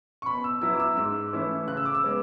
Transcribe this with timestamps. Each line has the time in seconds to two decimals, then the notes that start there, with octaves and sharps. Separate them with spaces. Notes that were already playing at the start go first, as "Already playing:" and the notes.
0.22 C#6
0.26 B2 B5
0.44 E6
0.62 F#3 B3 E4 E6
0.74 D6
0.80 E6
0.97 G#2 E6
1.33 E3 A3 C#4 E4
1.68 C#3 F#6
1.77 E6
1.85 D6
1.95 E6
2.04 G#3 B3